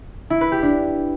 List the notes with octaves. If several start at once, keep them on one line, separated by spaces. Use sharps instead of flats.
E4
B4
G4
D4